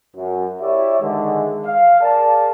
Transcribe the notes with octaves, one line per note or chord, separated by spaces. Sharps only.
F#2
E4 G4 C#5 D5 E5
G2 D3 D#3 G#3
F5
G#4 A#4 D5 A5